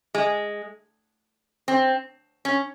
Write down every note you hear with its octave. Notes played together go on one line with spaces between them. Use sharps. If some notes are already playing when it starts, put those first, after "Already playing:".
G#3
C4
C#4